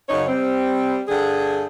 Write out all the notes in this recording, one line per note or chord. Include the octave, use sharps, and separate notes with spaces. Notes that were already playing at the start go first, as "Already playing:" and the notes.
F#2 C#3 D#4 C#5
G3 C4
G2 D3 G#4